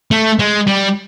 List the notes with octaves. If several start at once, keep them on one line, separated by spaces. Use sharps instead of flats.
A3
G#3
G3